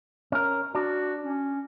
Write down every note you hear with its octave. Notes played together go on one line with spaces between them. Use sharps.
C#4 A#4
D4 F#4
C#4